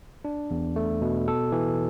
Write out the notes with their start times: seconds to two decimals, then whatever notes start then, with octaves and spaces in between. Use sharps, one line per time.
0.25 D4
0.51 E2
0.76 A3
1.02 B2
1.28 A4
1.52 E3